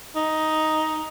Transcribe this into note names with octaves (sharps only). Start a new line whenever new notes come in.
D#4